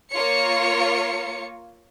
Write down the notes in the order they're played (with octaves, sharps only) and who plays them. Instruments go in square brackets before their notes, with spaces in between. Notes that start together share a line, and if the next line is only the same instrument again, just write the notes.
[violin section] A#3 F4 C#5 C#7